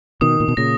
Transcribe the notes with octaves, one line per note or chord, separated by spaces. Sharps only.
B2 D#3 D#6
A#2
B2
A#2 C#3 A#6